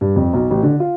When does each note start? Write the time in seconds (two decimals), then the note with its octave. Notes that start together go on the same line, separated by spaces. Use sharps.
0.01 G2
0.16 F2
0.33 B1
0.51 A1
0.63 D3
0.80 F4